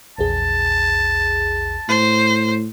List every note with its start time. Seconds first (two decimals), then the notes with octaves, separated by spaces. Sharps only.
0.18 A#1 E2 G#4 A5
1.88 A2 C5